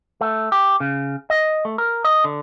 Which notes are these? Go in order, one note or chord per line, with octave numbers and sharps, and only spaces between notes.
A3
G4
C#3
D#5
A3
A#4
D#5
D3